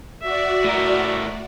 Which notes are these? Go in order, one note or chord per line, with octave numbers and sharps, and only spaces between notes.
F#4 D5 E5
A2 A#4